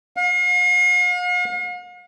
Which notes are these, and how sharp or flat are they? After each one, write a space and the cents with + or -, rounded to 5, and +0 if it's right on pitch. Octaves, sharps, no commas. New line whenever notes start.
F5 +45